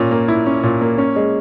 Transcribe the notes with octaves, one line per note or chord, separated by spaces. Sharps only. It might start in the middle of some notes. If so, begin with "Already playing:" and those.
Already playing: A#2 C#4
A#3
E4
C#4
A#2
A#3
C#4
G#3